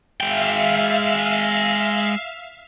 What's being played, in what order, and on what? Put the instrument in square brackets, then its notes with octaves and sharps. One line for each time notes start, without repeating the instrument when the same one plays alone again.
[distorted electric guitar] G#3 G5 [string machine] E5 F5